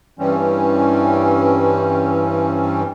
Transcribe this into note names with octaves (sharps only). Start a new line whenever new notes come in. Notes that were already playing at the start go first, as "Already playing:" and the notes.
G2 E3 G3 C4 C#4